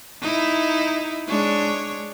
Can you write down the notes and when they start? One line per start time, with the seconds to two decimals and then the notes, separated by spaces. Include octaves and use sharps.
0.21 D#4 E4
1.28 G#3 D4 C#5